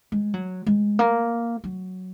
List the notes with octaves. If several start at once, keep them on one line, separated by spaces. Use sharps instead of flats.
G#3
F#3
G#3
A#3
F#3